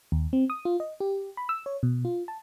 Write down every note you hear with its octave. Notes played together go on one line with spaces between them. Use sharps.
D#2
C4
D#6
F4
D#5
G4
B5
E6
C#5
B2
F4
A5